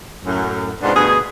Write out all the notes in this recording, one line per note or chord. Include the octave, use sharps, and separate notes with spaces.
F#2 A2
G#2 B2 B3 C4 D4 F4
D2 G2 B2 B3 G#4